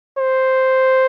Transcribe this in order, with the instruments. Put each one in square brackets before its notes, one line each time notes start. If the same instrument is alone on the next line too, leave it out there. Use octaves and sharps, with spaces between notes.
[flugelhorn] C5